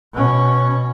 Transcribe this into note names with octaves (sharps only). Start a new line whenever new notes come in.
B2 C#4